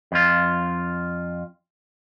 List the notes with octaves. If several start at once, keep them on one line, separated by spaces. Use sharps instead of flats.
F2 F4